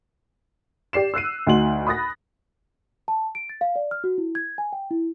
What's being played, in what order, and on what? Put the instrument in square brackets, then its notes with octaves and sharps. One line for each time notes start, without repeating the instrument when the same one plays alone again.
[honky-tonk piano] G4 D5 C7 E7
E6 F#6 C7 D#7
D2 D#4 F#4 C6 F#7
B5 D#6 F#6 A6 A#6
[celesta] A5
D7
A6
F5
D5
F6
F#4
E4
G#6
G#5
G5
E4